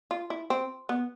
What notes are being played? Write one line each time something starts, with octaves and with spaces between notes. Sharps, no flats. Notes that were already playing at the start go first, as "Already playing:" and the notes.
F4
E4
C4
B3